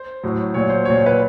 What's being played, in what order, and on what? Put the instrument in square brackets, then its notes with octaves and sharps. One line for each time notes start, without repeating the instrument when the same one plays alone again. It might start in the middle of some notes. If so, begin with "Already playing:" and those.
Already playing: [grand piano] C5
A2 F#3
A#2 F#3 C#5
C5
A#2 F#3 C#5
B4